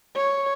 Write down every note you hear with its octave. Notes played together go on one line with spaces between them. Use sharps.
C#5